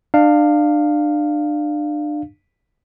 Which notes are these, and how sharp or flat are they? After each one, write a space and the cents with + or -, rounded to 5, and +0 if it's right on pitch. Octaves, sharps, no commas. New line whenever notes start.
D4 +30 F5 +0